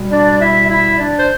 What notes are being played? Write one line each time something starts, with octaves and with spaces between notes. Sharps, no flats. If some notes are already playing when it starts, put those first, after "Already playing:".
Already playing: B2 G3
D4 D5
E4 E5
E4 E5
D4 D5
C5